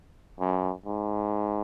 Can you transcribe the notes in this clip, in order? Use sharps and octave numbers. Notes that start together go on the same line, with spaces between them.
F#2
G#2